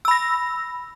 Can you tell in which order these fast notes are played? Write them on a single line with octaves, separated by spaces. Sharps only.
E6 B5 A#6